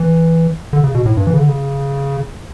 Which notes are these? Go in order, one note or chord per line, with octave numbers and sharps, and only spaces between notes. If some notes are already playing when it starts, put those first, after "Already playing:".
Already playing: E3
D3
C#3
B2
A2
G2
E3
C#3
D3
C#3